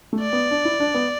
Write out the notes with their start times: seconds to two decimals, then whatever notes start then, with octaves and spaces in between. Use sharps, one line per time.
0.13 A3
0.22 D5
0.33 B3
0.51 D4
0.65 E4
0.80 D4
0.94 B3